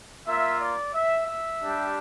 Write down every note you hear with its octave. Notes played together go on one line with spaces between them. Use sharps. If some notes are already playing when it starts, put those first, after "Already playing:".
A#3 F4 E5
D5
E5
E5
G3 D4 G4